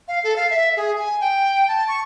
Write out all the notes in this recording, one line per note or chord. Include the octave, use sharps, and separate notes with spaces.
F5
A4
F5
E5
G#4
G#5
G5
A5
C#6